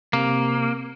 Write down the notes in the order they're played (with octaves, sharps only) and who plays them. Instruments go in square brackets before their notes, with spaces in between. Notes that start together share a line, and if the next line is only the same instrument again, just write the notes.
[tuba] C3 [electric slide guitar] A#3